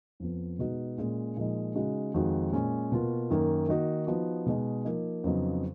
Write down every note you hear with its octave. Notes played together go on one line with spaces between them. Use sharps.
F2 F3 B3
B2 G#3 B3 D#4 F#4
A#2 G#3 C#4
A#2 F3 G#3 D#4
C#3 G#3 D#4 F#4
F2 D#3 G#3 D#4 F#4
A#2 G#3 C#4
B2 A#3 F4
F#2 D#3 A#3
D#3 A#3 D#4 F#4
F3 B3 D#4 F#4
B2 G#3 D#4
F3 A#3 D#4
F2 C#3 F#3 B3 D#4